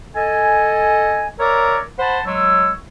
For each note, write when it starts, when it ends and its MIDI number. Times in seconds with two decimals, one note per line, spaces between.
0.15 1.28 69
0.15 1.28 75
0.15 1.28 80
1.39 1.79 70
1.39 1.79 73
1.39 1.79 74
1.39 1.79 76
1.39 1.79 82
1.99 2.20 72
1.99 2.20 78
1.99 2.20 81
1.99 2.20 83
2.25 2.72 54
2.25 2.72 56
2.25 2.72 73
2.25 2.72 88